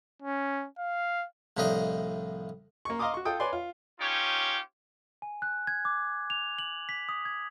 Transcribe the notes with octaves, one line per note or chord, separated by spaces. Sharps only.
C#4
F5
C2 A2 F3 D4 D#4 D#5
A#3 C#6
D#5 F5 A#5 C6 D6 D#6
F#4 C#6
F4 A4 G5 D#6
B4 C#5 D5 G#5 C6
F4
C#4 D#4 F4 G4 C#5
G#5
F#6
G#6
D6
F7
F#7
B6
D#6
G#6